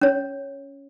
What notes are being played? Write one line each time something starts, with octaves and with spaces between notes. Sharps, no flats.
C#4 C#5